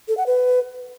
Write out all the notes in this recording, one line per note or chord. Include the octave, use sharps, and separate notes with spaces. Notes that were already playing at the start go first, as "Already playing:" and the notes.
A4
F#5
B4